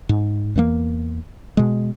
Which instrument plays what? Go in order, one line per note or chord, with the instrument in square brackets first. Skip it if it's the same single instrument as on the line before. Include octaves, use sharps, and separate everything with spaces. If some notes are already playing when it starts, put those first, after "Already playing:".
[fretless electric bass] G#2
E2 E3 A3 A#3
B2 G#3